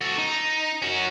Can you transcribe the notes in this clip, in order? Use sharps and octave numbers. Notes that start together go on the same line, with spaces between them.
F#4 A4
D#4
C#4 F#4